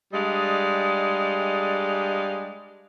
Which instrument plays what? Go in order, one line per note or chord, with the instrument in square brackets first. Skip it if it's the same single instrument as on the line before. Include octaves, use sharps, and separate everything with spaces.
[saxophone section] G3 G#3 D4 G#4 D#5 F5